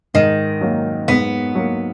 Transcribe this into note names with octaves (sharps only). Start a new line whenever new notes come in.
G#2 D#3
F#3 A#3
G#2 B3
F#3 A#3